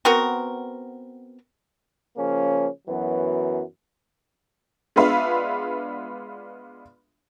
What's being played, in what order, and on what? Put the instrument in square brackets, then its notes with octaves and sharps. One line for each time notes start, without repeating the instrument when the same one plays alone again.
[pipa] B3 C4 F#4 A#4
[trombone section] C#3 F3 A#3 C#4
F#2 E3 F#3 B3
[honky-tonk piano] G#3 B3 D4 F4 B4 E5